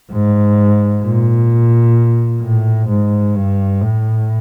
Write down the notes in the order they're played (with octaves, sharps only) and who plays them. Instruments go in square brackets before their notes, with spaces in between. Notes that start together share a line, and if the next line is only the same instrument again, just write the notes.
[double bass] G#2
A#2
A2
G#2
G2
A2